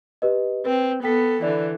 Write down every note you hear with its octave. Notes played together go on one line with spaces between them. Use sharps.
G4 B4 D#5
C4 B4
B3 A4 G5 B6
D3 E3 D5